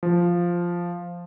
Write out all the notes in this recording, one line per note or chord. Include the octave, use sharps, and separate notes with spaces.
F3